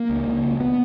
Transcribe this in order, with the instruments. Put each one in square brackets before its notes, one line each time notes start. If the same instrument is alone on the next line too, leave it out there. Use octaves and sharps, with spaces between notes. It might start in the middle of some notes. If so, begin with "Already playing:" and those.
Already playing: [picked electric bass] A#3
C#2
C#2
C#2
B3